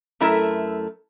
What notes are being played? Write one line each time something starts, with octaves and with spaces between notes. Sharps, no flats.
F#2 A3 E4 A#4 E5